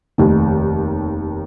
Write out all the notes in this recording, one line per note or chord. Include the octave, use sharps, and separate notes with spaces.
F1 D#2 D#3